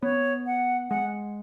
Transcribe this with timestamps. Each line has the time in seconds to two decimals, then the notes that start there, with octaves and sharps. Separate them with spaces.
0.02 B3 C#5
0.46 F#5
0.90 G#3 F#5